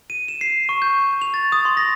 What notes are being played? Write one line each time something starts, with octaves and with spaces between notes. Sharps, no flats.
D#7
E7
C7
C#6
G6
F7
A6
D#6
C6
A#6